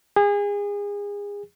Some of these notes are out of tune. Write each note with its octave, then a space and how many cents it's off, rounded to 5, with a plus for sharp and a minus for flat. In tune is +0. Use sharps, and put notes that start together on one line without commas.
G#4 -30